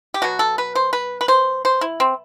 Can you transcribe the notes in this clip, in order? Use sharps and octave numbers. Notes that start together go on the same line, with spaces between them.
G4
B2 F#3 B3 F#4
A4
B4
C5
B4
B4
C5
C5
E4
C4